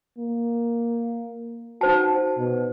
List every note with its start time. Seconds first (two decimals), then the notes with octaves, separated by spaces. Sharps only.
0.19 A#3
1.81 D#4 F#4 C5 A5
2.38 B2